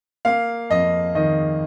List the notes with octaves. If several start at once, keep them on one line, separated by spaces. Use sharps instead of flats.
A#3 F5
F2 D#5
D#3 D#5